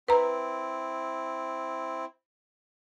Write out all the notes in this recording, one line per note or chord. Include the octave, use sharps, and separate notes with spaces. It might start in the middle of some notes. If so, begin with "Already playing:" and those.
C4 E4 B4 A#5